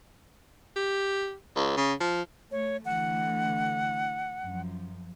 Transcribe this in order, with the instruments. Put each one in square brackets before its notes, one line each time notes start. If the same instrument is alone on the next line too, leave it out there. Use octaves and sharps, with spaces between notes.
[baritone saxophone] G4
C#2
C#3
F3
[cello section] A3 [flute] C#5
[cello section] D3 E3 A3 [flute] F#5
[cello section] F#2 F3